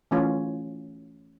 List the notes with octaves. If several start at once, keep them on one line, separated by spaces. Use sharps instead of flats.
E3 A3 C#4 F4